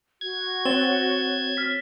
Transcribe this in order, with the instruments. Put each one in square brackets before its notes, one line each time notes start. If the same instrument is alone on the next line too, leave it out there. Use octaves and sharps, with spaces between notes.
[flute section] F#4 [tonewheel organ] G#6
[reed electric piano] C4 C#5 [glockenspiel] A6 E7 G7
[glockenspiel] F6 B6